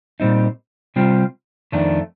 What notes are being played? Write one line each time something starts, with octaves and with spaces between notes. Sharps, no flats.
A#2 G3 C4 D#4
C3 G3 C4 F4
F2 D#3 A3 D4